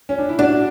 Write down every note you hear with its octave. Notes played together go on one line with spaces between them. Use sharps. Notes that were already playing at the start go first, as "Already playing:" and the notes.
C#4
D4
E4
D4 F#4